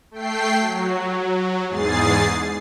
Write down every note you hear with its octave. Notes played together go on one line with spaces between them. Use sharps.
A3 G5 C7
F#3
E2 G#2 G#4 A6 C7